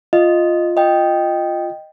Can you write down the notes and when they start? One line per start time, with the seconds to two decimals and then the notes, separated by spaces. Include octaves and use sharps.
0.13 F4 D#5
0.77 D#5 G5